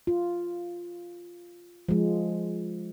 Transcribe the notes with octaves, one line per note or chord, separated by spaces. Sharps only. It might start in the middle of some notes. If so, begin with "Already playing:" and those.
F4
F3 G#3